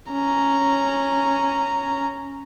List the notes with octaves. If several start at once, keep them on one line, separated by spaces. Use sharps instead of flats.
C#4 A#5